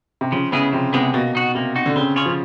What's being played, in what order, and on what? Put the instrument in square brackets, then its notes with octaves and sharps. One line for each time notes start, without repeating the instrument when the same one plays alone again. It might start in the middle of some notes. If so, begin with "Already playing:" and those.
[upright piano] C3
[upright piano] C#3 [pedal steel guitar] F3
[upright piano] C#3 [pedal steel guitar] G#3 B3 E4 G#4
[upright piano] C3 [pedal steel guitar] F3
[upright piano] C3 [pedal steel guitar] G#3 B3 E4 G#4
[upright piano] B2 [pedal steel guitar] A#3
[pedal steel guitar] D#4 F#4
[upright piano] C3 [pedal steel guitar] A#3
[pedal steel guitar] D#4 F#4
[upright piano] D3
[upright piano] C#3 [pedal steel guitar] C4
[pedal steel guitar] F4 G#4 C#5
[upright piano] F3